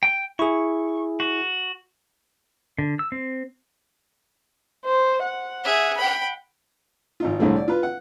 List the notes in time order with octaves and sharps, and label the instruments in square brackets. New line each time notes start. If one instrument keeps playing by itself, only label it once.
[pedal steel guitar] G5
[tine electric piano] E4 G#4 [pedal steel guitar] C#6
[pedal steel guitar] F#4
D3
E6
C4
[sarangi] C5
F#5
[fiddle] G#4 E5
G5 B5
[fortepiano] G#1 D#4 F4
C2 A2 D3 G#3 A3 C4
D5
F4 B4
F#5